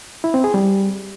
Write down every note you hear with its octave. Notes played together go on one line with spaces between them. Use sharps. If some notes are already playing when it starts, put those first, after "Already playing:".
E4
C4
G#4
G3